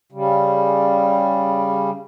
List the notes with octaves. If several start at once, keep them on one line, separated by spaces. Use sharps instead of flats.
C#3 G3